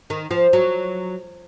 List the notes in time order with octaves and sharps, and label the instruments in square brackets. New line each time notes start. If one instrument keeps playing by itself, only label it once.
[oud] D#3
F3
F#3